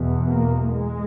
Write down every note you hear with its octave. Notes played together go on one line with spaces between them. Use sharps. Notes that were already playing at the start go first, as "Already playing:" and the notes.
Already playing: E2 B2
A#3
G#3